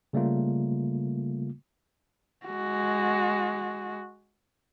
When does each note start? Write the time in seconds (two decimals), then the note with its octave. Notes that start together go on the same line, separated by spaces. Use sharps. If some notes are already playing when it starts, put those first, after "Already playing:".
0.13 C#3 G3 A3 A#3 F4
2.47 G#3 F#4